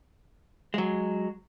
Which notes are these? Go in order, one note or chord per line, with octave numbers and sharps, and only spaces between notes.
F#3 G#3